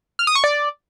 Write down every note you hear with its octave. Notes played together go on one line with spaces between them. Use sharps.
F6
D#6
C#6
D5